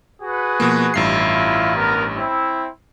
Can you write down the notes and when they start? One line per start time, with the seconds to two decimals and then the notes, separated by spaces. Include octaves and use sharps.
0.21 F#4 G#4 B4
0.60 B2 F3 A#3
0.94 A1 G2 E4 F4 C7
1.75 B3 A#4
2.16 C4 E4